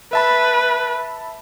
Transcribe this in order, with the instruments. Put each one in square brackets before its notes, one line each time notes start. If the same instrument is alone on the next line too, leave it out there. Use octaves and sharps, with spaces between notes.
[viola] B4 [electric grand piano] E5 A5 B5